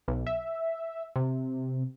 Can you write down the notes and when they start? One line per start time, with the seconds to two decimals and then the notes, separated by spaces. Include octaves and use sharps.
0.08 B1
0.27 E5
1.16 C3